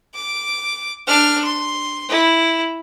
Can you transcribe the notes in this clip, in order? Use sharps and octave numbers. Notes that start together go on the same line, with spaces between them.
D6
D4 F6
C6
E4